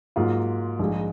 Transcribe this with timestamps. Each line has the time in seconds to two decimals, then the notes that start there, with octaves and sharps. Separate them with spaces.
0.16 G#2 F#3 A#3 F4
0.79 A#1 G#2 D#3 G#3